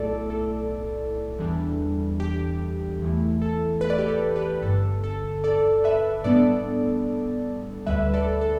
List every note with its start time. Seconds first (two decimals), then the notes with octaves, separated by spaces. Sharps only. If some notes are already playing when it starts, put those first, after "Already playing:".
Already playing: B1 A2 A3 E4 A4 D5
0.30 A4
1.39 E2 E3 G3 D4
2.20 G4
3.01 E2 E3 A3 E4
3.42 A4
3.81 B4
3.90 D5
3.99 G4 B4
4.08 A4
4.36 G4 B4
4.62 G1 G2 D3 A4
5.04 A4
5.44 A4 D5
5.84 B4 E5
6.24 A2 G3 B3 D4 A4 D5
7.86 D2 D3 G3 B4 E5
8.14 A4 D5
8.41 A4